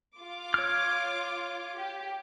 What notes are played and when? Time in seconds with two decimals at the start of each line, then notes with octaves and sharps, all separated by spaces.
0.19 F4 D6
0.54 C#5 F6
1.78 G4